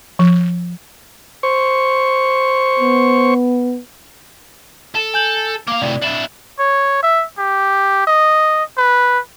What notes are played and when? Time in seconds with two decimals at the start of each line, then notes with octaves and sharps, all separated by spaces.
0.19 F3
1.43 C5 C#6
2.80 B3
4.95 A4
5.14 G#5 G6 F#7
5.68 A#3 F5 D6
5.82 A2 C3 D5
6.02 D4 E4 E7 F#7
6.59 C#5
7.03 E5
7.38 G4
8.07 D#5
8.77 B4